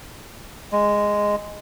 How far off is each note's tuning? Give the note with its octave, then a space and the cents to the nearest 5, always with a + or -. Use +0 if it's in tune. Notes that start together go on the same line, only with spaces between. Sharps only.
G#3 -5